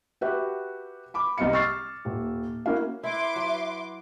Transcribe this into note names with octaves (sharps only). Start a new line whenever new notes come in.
F#4 G4 B4 E5 F#5
B5 D6
C2 C3 D#5 F5 C#7
C#6 E6 F6 A6 C7
D#1
A#3 C#4 E4 F#4 F5
E4 B4 E5 C6 D6
F#3